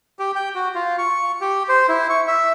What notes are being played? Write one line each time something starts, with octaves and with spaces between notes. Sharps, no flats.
G4
G5
F#4
F4
C#6
G4
C5
E4
C#6
E5